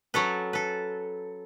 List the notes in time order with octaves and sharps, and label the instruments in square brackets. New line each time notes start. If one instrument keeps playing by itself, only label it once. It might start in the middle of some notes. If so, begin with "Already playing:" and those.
[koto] F#3 C#4 A4 B4
A4 B4